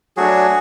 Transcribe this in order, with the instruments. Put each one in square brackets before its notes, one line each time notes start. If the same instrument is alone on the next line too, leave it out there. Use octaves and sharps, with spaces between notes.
[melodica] F#3 A3 D4 F#4 G#4